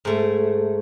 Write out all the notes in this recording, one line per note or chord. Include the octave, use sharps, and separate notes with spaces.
G#2 A3